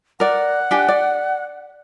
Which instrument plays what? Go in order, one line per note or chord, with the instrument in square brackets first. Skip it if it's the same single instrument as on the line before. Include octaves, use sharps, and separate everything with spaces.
[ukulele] A#4 D5 [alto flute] F#5
[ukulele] D4 G4 G#5
D5